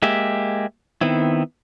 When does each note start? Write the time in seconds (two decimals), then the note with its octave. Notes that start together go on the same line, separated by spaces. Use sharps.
0.02 G#3 A#3 G4 E5
1.01 D#3 B3 C4 E4